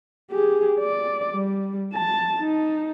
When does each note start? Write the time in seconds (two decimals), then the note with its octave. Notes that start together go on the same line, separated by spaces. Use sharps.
0.31 G4 G#4
0.80 D5
1.31 G3
1.93 A5
2.39 D#4